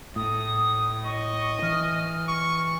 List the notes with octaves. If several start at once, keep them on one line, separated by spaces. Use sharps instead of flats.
A2 D#6
D#5 C#6
E3 F6
C#6